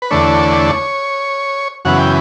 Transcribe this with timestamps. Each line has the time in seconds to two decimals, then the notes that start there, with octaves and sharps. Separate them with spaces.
0.02 B4
0.11 E2 D3 A3 D4 C#5
1.85 F#2 C#3 E3 B3 F#5
1.99 G5